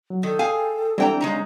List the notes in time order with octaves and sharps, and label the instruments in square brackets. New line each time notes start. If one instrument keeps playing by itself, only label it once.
[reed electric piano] F#3
[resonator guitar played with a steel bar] D#3 [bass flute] A4
[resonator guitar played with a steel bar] G#4 F5 G#5 [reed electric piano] G5
[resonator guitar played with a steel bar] E3 G5 A#5 [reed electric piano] G3 C4 D4
[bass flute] C#3 [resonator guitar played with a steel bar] G#3 D#4 A#5